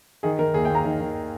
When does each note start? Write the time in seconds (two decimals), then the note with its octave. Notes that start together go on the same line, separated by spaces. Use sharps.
0.23 D#3 G#4
0.39 D#3 A#4
0.54 D#2 G#4
0.65 G5
0.70 D#2
0.75 A#5
0.85 D#3
1.00 D#3